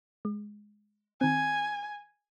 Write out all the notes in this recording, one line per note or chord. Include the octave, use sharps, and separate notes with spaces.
G#3
D#3 C4 G#5